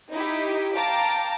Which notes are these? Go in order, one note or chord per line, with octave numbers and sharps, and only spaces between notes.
D#4 E4 G4
F5 G5 A5 A#5 D6